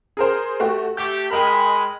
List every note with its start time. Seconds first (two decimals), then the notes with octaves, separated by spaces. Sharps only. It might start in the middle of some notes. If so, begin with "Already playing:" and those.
0.17 G#4 A#4 C5
0.60 A3 F#4 G4
0.97 A3 G4 G6
1.30 G#3 A#4 D#5 G5 B5